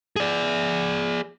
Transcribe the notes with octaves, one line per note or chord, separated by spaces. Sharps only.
G#4 D5